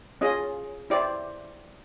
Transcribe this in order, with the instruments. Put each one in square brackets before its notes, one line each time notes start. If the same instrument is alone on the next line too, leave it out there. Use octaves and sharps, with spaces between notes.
[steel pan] C#4 F4 G#4 D#5
E4 G4 C5 D5